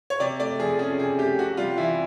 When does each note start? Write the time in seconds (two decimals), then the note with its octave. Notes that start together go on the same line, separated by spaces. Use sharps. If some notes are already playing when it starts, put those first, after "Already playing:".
0.10 C#5
0.20 C3 D5
0.39 A3 D5
0.59 F3 G#4
0.79 C#4 G#4
0.99 C3 G#4
1.19 A3 G4
1.39 C3 F#4
1.57 G3 F4
1.78 E3 E4